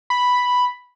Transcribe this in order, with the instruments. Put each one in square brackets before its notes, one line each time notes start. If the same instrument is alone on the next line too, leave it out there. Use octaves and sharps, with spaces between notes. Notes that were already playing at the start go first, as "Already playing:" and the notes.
[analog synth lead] B5